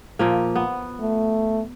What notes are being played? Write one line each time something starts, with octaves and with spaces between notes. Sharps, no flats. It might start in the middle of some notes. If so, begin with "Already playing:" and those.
A#2 F3 A#3
B3
A3